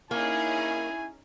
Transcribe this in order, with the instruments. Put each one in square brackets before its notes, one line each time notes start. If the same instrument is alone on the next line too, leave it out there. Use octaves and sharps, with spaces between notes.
[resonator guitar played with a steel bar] A#3 [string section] C#4 D#4 G#4 [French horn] E4 [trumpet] G#5